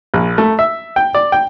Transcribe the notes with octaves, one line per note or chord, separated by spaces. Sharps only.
A#1
A3
E5
G5
D5
G5